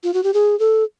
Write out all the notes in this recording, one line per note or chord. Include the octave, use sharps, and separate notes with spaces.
F4
F#4
G4
G#4
A4